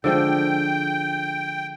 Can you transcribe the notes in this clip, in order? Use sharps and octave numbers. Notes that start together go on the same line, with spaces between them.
D3 F3 G#3 G5